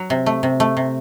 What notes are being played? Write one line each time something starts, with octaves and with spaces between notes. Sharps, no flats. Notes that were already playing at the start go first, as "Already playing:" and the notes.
Already playing: F#3
C3
A3
C3
A3
C3